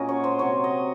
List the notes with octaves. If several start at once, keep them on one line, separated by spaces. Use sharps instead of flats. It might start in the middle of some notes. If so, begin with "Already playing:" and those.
Already playing: A#2 F#3 A#3 C#4 A#4 D#5
C#5
C5
C3 F#3 C4 C#5
D#5